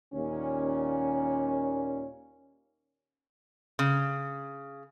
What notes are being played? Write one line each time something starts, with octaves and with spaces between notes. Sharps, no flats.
D#2 A#2 C#4
C#3